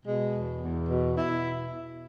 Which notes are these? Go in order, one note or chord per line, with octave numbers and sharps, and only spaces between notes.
B2 G#3
E2
E2
B2
B2 E4